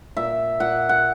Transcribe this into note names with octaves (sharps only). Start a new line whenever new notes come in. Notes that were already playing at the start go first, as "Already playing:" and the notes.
A#2 E5
A#2 F#5
F#5